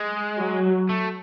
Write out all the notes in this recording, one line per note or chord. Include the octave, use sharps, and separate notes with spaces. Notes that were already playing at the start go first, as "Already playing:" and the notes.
Already playing: G#3
F#3
A3